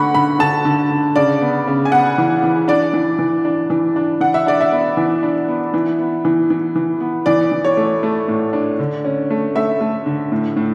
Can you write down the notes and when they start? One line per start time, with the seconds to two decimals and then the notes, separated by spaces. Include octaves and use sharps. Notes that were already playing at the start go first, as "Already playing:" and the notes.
Already playing: D3 A3 F#5 B5 C#6
0.14 D3 B5
0.39 D3 A5
0.65 D3
0.91 D3
1.16 C#3 D5
1.41 B3
1.67 C#3
1.85 G#5
1.92 B3 F#5
2.18 E3
2.44 E3
2.68 D4 D5
2.94 E3
3.19 E3
3.45 D4
3.70 E3
3.96 D4
4.20 E3 F#5
4.34 E5
4.46 D4 D5
4.61 E5
4.72 B3
4.97 E3
5.23 D4
5.48 B3
5.74 E3
5.99 B3
6.25 E3
6.50 E3
6.76 E3
7.00 B3
7.26 E3 D5
7.52 E3
7.65 C#5
7.77 A3
8.03 A3
8.28 A2
8.53 D4
8.79 D3
9.05 C#4
9.30 A3
9.56 A3 E5
9.81 A3
10.06 D3
10.32 A2
10.56 A2